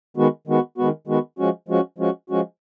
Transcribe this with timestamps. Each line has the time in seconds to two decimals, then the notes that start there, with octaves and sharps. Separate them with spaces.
0.17 D#3 G#3 B3 F#4
0.47 D#3 G#3 B3 F#4
0.78 D#3 G#3 B3 F#4
1.07 D#3 G#3 B3 F#4
1.39 F3 G#3 C#4 F#4
1.68 F3 G#3 C#4 F#4
1.98 F3 G#3 C#4 F#4
2.30 F3 G#3 C#4 F#4